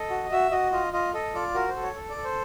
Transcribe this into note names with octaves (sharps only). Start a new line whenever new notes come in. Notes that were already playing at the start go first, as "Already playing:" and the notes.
Already playing: A4 D#5
F#4
F#4 E5
F#4 D#5
F4 D#5
F4 D#5
A4 D#5
F4 D5
F#4 A#4
C5
A4
C#5
A4
D5
A4
C5